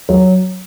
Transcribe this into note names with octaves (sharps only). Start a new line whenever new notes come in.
F#3